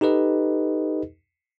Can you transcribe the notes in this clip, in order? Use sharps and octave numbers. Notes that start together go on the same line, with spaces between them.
D#4 G4 A4 B4 D#5